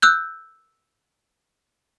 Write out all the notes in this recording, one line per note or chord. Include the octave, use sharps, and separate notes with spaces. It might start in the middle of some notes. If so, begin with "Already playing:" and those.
E6 F#6 G6